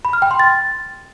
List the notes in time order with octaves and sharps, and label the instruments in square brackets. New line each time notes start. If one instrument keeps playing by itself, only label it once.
[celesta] B5
F6
G5
C6
A6